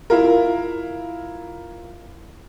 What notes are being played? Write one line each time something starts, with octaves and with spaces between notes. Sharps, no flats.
E4 F4 A#4